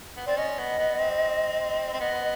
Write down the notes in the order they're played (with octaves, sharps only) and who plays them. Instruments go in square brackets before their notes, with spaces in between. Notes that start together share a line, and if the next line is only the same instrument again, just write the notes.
[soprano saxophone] B3
[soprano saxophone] C4 [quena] D5
[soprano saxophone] C#4 [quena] D#5
[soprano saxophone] B3
B3
C4
C4
[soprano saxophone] B3 [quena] D#5